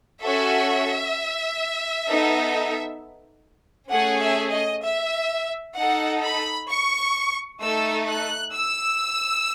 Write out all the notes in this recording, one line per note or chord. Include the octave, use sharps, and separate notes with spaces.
C#4 F#4 A4 E5
B3 D#4 A4
A3 C#4 G#4 F#5
E5
D#5
E5
D#4 A4 F#5
B5
C#6
A3 D#4 A4 E6
F#6
E6